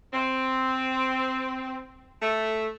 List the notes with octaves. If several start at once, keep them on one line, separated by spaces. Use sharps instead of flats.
C4
A3